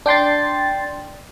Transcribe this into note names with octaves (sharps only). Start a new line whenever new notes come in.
D4 G5 C6 A6